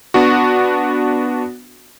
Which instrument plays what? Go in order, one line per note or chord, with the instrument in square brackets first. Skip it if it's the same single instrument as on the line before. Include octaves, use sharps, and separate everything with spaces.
[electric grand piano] B3 D4 F#4